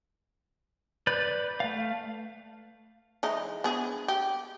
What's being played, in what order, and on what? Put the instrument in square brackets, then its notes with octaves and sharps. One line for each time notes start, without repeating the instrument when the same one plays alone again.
[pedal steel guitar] B4 D5 B5 G6
A3 F5
[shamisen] E3 G#3 D#4
B3 D4 G#4
G4